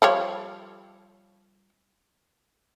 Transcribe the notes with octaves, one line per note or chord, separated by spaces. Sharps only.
F3 G3 C#5